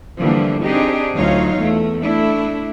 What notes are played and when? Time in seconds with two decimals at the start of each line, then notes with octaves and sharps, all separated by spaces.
0.19 D3 E3 F3 G3 A#3 D4
0.62 C4 D4 D#4 G4 G#4
1.16 D2 F#3 D#4 F4 C#5 F5
1.58 E2 A3
2.01 A3 D4 E4